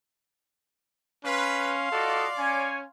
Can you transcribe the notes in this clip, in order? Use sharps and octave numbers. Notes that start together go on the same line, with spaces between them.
C#4 B4 F5 C6
F4 F#4 A4 D5 D#5
C#4 C#5 G#5